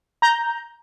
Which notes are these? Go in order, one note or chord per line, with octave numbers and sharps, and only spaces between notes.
A#5 G6